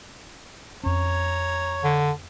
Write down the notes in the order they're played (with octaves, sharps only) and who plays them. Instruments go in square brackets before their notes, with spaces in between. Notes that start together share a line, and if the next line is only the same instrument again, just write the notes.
[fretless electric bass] F2 C#4 [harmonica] C#5 A#5
[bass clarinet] D3